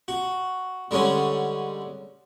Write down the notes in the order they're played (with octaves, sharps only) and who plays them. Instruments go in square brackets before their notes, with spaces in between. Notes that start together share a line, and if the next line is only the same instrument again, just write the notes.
[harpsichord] F#4
D3 G3 G#3 C#4 F#5